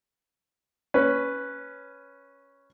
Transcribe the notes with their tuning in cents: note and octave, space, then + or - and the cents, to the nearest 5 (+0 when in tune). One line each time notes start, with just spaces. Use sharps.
C#4 +0 B4 +0